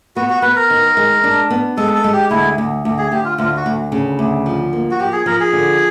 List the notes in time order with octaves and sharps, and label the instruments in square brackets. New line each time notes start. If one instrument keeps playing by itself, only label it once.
[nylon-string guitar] B3 [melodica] F#4
[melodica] F#4
[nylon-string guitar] B3 [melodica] B4
[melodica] A#4
[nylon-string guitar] D#3
G#3
D4
B3
[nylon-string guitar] G#3 [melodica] A4
[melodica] A4
[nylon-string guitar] G#3
[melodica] G4
[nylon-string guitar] D2 [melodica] E4
[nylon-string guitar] D2
D2
[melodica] G#4
[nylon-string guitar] D2 [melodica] G4
[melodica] F4
[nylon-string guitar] D2 [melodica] F4
[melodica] F#4
[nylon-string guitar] D2
C#3
D2
F3
A#3
[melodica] F#4
[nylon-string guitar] F3 [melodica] G4
[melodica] G#4
[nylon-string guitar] F3 [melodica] A#4
[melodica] G#4
[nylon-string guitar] D3